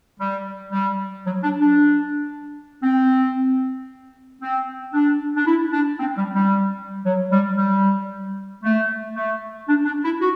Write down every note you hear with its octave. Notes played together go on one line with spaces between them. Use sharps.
G3
G3
F#3
D4
D4
C4
C4
D4
D4
E4
D4
C4
G3
G3
F#3
G3
G3
A3
A3
D4
D4
E4
F#4